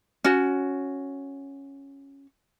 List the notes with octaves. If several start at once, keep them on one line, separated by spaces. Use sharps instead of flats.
C#4 F#4